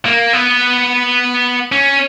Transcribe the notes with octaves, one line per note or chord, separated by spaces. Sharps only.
A#3
B3
C#4